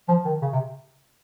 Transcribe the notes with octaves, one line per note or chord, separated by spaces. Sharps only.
F3
D#3
C#3
C3